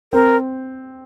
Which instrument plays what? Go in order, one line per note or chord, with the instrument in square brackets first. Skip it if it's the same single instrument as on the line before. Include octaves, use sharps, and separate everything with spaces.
[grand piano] C4 [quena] A#4